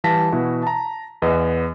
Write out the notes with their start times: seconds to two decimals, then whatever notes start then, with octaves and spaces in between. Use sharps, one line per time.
0.04 E3 G3 F5 A5 A#6 B6
0.32 B2 E3 E4 F#4
0.63 A5 A#5
1.22 E2 B3 B4 D#5